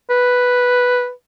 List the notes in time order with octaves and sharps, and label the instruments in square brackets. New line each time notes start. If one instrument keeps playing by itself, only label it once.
[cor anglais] B4